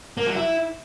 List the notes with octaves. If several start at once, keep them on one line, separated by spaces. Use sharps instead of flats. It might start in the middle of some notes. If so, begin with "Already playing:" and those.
A#3
F#3
E4